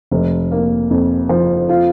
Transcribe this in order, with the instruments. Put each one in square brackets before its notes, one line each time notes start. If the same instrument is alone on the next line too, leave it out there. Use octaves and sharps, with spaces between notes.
[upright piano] F1
A#3
F2
F3
F4